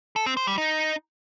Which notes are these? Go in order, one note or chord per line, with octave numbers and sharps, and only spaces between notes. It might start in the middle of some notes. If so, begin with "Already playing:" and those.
A4
C4
C5
G3
D#4